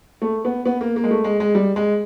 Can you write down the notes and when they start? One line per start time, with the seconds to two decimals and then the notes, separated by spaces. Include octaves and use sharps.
0.22 A3
0.45 B3
0.66 B3
0.81 A#3
0.96 A#3
1.04 G#3
1.11 A3
1.24 G#3
1.40 G#3
1.55 G3
1.76 G#3